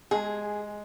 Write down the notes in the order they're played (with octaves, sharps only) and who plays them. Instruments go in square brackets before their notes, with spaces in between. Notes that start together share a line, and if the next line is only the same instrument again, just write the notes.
[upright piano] G#3 [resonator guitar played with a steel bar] G#4